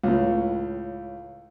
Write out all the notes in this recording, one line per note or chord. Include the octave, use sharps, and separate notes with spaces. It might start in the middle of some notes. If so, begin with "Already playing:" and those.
C#2 A2